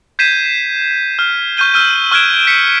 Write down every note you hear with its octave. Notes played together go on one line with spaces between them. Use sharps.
G6 G#6 B6 C7 D#7 E7
F6
C#6 F6 G6 D#7 G7
E6 F6 G6 D#7
C#6 F6 F#6 G#6 D7 E7
B6 C#7 D7